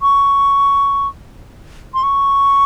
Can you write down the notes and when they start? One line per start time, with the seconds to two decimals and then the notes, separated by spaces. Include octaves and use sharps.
0.02 C#6
1.94 C6
2.03 C#6